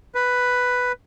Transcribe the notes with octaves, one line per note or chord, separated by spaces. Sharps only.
B4